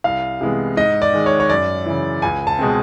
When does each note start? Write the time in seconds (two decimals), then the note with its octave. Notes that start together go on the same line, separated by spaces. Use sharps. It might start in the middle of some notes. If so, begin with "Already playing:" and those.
0.04 C2 F5
0.41 C3 E3 G#3 B3
0.77 G#2 D#5
1.02 D5
1.13 D#3 G#3
1.26 C#5
1.40 C#5
1.50 F#2 D5
1.86 C#3 E3
2.22 C#2 G#5
2.47 A5
2.59 B2 G#3 C4